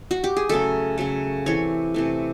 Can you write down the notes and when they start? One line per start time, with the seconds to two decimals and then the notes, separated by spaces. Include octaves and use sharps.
0.11 F#4
0.24 G4
0.36 G#4
0.49 C#3 F#3 A3 A4
0.98 C#3 F#3 A3
1.46 C3 E3 A3 C#5
1.94 C3 E3 A3